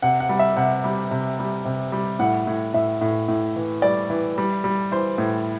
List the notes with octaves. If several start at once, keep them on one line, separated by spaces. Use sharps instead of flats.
C3 F#5
F#5
G3
E5
C3 F#5
G3
C3
G3
C3
G3
A2 F#5
A2
A2 E5
A2
A2
E3
G3 D5
E3
G3
G3
E3 C5
A2